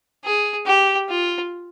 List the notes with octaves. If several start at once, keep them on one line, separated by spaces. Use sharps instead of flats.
G#4
G4
F4